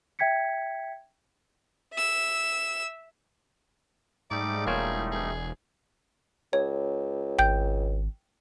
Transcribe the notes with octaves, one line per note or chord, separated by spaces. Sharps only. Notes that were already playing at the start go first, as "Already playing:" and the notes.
E5 G5 G#6 B6 C#7
E5 E6
G#2 G3 A3 D#4 D5
E1 A#3 F4 G#4 C#5
G#4
C#2 C#5
G#1 G5 G6